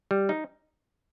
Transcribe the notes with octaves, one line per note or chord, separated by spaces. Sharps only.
G3
D#4